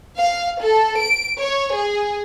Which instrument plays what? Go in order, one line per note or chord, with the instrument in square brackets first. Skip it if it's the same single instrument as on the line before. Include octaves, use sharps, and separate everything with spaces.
[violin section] F5
A4
D7
C#5
G#4